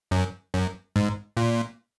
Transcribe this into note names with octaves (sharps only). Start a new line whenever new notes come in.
F#2
F#2
G#2
A#2